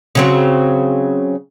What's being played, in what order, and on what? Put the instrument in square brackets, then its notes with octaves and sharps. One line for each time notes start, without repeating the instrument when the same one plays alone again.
[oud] C#3 F#3 C4